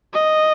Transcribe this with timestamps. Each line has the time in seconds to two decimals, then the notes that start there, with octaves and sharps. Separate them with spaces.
0.13 D#5